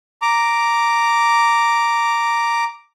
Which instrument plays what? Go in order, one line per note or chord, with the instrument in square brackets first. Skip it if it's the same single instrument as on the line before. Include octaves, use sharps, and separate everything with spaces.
[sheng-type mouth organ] A#5 D6